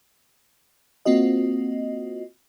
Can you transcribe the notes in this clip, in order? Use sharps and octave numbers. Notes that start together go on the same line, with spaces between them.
A#3 C4 F4 F#4 D#5